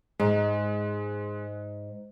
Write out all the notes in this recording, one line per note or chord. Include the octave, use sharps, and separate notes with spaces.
G#2 G#3